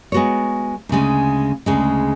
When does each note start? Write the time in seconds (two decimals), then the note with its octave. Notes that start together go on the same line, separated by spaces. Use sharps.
0.12 G#3 B3 F#4 C#5
0.89 D2 C#3 G#3
1.66 D2 C#3 G#3